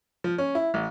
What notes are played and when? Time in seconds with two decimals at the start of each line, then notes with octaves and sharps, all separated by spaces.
0.24 F3
0.38 C#4
0.55 E4
0.74 A1